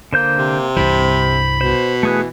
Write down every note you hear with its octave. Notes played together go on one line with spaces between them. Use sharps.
D3 A#3 C5 G6
C3
C2 G2 E3 C5 B5
B2 C5
E3 A3 G#4 B4